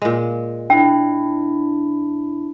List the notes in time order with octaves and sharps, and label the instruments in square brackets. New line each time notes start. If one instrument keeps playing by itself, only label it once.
[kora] A#2 G#3
[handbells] D4 E4 [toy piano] G5